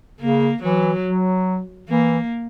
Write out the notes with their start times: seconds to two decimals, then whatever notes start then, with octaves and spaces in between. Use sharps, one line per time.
0.20 C#3 A#3
0.63 E3 F#3
1.04 F#3
1.89 E3 A#3